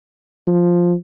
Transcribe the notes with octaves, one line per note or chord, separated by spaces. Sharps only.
F3